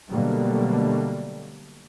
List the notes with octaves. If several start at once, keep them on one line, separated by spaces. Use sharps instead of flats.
B2 D3 F#3 G3 A3 A#3